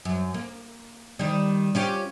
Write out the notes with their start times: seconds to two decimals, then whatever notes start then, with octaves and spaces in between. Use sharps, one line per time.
0.05 F#2
0.34 A#3
1.19 D#3 G3
1.75 C#4 F4 G4